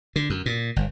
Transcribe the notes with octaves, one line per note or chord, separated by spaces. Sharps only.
D3
F#2
A#2
G1